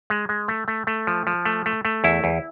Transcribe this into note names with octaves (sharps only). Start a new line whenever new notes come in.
G#3
G#3
A3
A3
A3
F3
F3
A3
A3
A3
E2 E4
E2